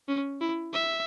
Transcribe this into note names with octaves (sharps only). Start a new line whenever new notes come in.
C#4
E4
E5